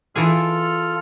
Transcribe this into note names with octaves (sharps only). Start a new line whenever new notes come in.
E3 F4 G#4 A4 F6